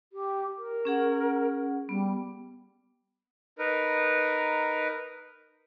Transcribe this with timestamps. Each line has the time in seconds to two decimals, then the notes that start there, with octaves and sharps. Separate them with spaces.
0.13 G4
0.58 A#4
0.85 C#4 G#4 F#5
1.89 G3 B3
3.59 D#4 A#4 B4